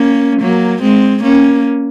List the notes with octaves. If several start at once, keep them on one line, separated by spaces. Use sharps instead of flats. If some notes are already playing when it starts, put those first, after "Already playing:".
Already playing: A#3 C#4
F#3 A#3
G#3 C4
A#3 C#4